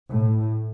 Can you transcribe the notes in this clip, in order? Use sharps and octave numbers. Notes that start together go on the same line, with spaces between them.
A2